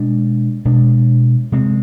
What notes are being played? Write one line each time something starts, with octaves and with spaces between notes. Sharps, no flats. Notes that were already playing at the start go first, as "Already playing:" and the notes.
Already playing: B2 G#3 D4
B2 G#3 D4
C3 G#3 C4